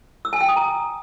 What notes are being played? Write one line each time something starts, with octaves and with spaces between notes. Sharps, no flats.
E6
G#5
G5
D#6
A#5